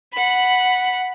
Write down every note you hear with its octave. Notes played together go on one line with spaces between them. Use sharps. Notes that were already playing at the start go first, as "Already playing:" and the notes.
F#5 B5